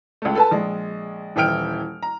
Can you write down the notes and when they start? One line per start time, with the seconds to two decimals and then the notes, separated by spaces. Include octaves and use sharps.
0.22 C#2 A3
0.35 A4 B4 A5
0.51 A#1 G#3
1.36 D#1 E3 E4 G5 F6 D7
2.03 A#5